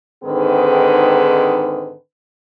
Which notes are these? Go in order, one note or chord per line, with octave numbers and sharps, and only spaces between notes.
G#2 D3 D#3 C4 G#4 B4